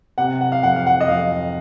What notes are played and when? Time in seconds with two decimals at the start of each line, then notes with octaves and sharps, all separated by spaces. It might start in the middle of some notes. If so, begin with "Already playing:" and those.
0.18 C3 F#5
0.41 F#5
0.52 F5
0.63 F2 F#5
0.76 F5
0.87 F#5
1.01 D#5
1.08 F2 F5